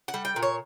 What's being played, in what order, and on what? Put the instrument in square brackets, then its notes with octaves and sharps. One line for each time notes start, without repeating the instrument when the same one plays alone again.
[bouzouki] F#5
G3
G5
A#2
C#5